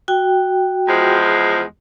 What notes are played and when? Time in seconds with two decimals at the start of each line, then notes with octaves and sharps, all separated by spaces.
0.08 F#4 G5
0.88 E2 F3 G#3